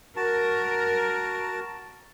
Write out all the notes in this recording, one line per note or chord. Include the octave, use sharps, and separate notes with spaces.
F#4 A#4 A5